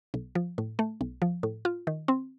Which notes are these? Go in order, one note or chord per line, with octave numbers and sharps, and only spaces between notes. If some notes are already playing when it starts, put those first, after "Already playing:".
B1
F3
A2
A3
B1
F3
A2
F4
D#3
C4